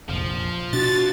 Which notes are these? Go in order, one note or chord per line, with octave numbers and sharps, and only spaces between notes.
F1 A#1 F3
B2 D4 F#4 A6